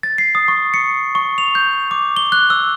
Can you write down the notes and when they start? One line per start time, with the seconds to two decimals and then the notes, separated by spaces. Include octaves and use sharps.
0.03 A6
0.18 C7
0.35 D#6
0.48 C#6
0.74 C#7
1.15 C#6
1.38 F7
1.55 G6
1.91 D6
2.17 G7
2.32 F#6
2.50 E6